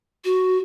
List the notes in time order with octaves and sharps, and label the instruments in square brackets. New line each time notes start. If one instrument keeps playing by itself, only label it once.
[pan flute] F#4